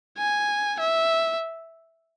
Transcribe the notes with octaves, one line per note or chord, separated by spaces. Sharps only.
G#5
E5